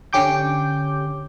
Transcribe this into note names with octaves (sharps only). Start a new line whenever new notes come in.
D3 C#4 G4 D6 G6